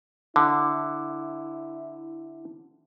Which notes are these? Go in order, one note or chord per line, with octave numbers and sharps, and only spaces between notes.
D3 E4